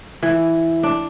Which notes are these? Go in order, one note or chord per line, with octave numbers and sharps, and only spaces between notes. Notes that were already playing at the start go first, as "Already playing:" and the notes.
E3
D4